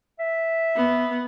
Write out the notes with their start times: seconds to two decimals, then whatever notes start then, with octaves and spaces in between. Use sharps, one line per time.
0.19 E5
0.76 B3